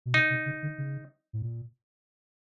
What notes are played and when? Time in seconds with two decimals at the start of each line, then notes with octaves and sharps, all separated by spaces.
0.06 B2
0.14 C3 D#4
0.30 C3
0.46 C#3
0.63 D3
0.78 C#3
1.33 A2
1.42 A#2